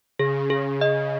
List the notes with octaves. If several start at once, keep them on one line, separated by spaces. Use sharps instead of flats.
C#3 G#4
G#4
D#5